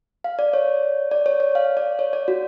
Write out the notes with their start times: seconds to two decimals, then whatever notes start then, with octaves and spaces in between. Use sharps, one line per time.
0.24 F5
0.39 D5
0.54 C#5
1.11 D5
1.26 C#5
1.40 C#5
1.55 F5
1.77 D5
1.99 C#5
2.13 D5
2.28 F#4